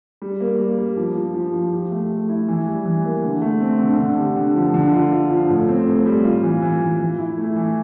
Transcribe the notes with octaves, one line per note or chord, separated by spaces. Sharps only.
G3
A#3
G3
G3
F3
F3
F3
F3
G4
A3
A3
E4
E3
G3
E3
A#3
D3
A3
C4
D3
D3
G4
D3
F3
D3
F4
F4
F3
A2
C4
A2
G3
F4
E3
E3
E3
E3
E4
A3
E3